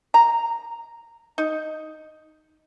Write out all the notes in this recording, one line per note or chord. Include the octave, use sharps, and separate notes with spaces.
A#5
D#4